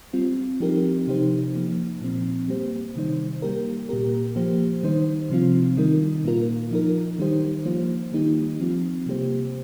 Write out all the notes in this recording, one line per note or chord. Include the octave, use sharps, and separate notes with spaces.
G3 C4 F4
F3 C4 D#4 G4 A#4
C3 F3 D#4 G4 C5
F3 A#3 D#4
A#2 F3 C4
G3 A#3 G4 C5
C3 D#3 G3 D#4 C5
G3 A#3 G4 A#4
A#2 A#3 G4 A#4
F3 A#3 G4 C5
D#3 G3 D#4 C5
C3 F3 C4 F4
D#3 G3 D#4 A#4
A#2 A#3 F4 A#4
F3 D#4 A#4
D#3 G3 D#4 G4 C5
F3 A#3 F4 C5
D#3 G3 A#3 D#4 G4
F3 C4 F4
C3 G3 A#3 G4 C5